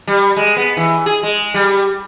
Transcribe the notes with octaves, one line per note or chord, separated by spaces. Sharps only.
G3
G#3
B3
E3
G#4
G#3
G3